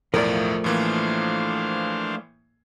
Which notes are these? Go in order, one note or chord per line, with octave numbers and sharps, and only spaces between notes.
B1 E2 A2 F3 A3 A#4 D5
A2 E3 A#3 D4 C5 F5